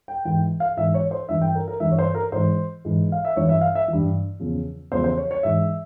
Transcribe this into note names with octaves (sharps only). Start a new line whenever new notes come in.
G5
G#2 E3 G5
F5
G#2 E3 E5
C#5
C5
G2 E3 E5
G5
A#4
A#4
G2 E3 E5
C#5
C5
A#4
G#2 E3 C5
G#2 E3
F5
E5
G2 E3 C#5
E5
F5
E5
G2 E3
E2 C#3 F3
E2 C#3 F3 C5
C5
C#5
C#5
G#2 E3 E5